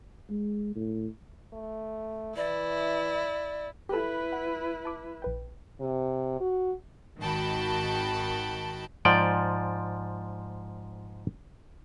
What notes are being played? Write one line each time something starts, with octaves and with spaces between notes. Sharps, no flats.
G#3
A2
A3
E3 E4 D5
E4 G4 A4 B4
F#5
A5 D6
A#1 B4 G5
C3
F#4
G#1 D#3 F#4 G5 A5 B5
G#2 F3 D5 G5